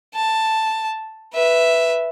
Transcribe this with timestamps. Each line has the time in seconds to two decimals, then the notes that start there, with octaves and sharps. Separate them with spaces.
0.15 A5
1.33 B4 E5